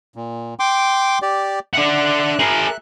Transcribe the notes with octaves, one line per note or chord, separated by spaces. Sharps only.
A#2
G5 C6 D6
G4 D5
D4 E5 F#5 F#6
G#4 A#4